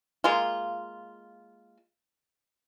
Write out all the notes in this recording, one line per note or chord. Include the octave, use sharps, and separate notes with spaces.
G#3 A#3 F4